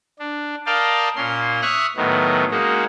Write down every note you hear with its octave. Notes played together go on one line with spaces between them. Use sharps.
D4
A#4 D5 D#5 F5 G5 A5
A#2 A#3 C#4 C6
E5 C#6 D#6 F6 F#6
A2 D#3 F#3 B3
G#3 A#3 C#4 D#4 F#4